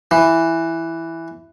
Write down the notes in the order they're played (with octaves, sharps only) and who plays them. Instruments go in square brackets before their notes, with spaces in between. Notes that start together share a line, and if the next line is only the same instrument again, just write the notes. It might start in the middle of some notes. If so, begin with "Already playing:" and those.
[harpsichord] E3